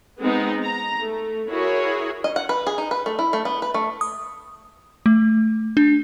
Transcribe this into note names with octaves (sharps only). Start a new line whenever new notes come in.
G#3 B3 C4 D#4
A#5
A3
E4 F#4 G#4 A#4 C#5
D#5
F#5
B4
G#4
D#4
B4
A3
E4
A3
B3
B4
A3
D#6
A3
D4